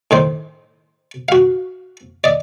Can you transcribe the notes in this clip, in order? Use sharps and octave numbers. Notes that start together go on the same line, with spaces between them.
A2 D#3 C5
F#4 F5
D5 D#5